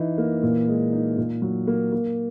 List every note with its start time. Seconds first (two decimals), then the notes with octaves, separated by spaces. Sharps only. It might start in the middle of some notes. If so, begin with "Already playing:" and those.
Already playing: E3 D#4
0.18 A#3
0.43 A#2
0.68 G#3
0.92 D#4
1.18 A#2
1.42 F#3
1.67 A#3
1.92 A#3